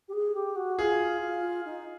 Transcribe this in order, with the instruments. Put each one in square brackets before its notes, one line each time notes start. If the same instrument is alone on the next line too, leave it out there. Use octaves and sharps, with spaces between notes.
[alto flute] G4
G#4
G4
F#4
[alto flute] F4 [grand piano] G#4
[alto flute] F4
D#4